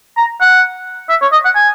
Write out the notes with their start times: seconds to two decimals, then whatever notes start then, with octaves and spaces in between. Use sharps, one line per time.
0.17 A#5
0.41 F#5
1.09 E5
1.22 C#5
1.33 D#5
1.45 F#5
1.56 G#5